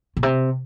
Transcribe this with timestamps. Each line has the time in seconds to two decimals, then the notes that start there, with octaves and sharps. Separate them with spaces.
0.17 A#2
0.23 C3